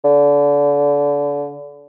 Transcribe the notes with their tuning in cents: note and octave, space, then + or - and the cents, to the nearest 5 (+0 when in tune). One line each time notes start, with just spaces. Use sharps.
D3 -30